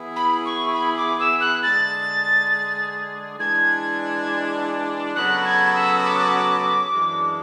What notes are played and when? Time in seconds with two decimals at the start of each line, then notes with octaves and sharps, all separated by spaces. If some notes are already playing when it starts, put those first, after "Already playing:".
Already playing: E3 B3 E4 G#4
0.16 B5
0.45 C#6
0.74 B5
0.97 D6
1.19 E6
1.41 F#6
1.62 D3 G#3 D4 G#4 A6
3.39 E3 G#3 D4 G#6
5.16 C#3 F#3 B3 F#4 A4 F#6
5.45 G#6
5.75 E6
6.05 D6
6.93 F#2 E3 G#3 D4